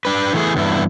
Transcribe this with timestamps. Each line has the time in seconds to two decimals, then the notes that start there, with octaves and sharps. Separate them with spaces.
0.05 D4 B4
0.33 E3 A3 G#4
0.56 E2 G2 E4